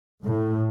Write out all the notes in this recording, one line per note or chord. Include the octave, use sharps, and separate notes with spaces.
A2